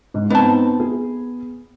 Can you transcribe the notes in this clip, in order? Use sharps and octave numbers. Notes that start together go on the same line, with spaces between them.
G#2
B3 C4 D#4 A5
G#4